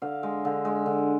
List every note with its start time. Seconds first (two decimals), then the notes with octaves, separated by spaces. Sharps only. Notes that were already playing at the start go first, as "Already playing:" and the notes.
0.02 D3 F5
0.23 G#3
0.45 D3
0.65 G#3
0.86 D3